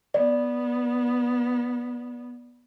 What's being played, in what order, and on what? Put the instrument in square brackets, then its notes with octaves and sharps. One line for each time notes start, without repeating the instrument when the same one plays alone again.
[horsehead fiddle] B3 [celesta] D5